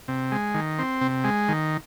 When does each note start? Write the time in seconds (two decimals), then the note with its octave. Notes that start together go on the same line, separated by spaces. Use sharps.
0.08 C3
0.32 G#3
0.54 D#3
0.79 C4
1.01 C3
1.24 G#3
1.49 D#3